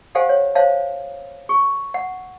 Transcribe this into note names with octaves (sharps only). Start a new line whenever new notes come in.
G4 A4 C5 F5 F#5 G#5
C#5
C5 C#5 E5 F5 A5
G#4 C#6
F#5